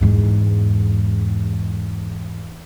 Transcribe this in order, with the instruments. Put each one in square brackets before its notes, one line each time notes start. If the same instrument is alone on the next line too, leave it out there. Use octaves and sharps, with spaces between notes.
[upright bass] E2 G#2